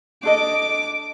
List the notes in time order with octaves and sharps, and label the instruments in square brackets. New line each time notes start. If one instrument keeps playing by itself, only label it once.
[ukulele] D4 A4 D#5 [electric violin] D6